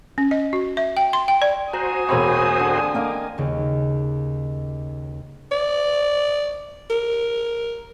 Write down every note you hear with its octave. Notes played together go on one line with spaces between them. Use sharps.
C#4
D#5
F#4
E5
G5
C6
G5
D5
F#4 C5 G#5 A#5 D#6
E1 A#3 C4 C#5 B5
D3
A#3 D#5 F5 D6
D#2 C#3
D5
A#4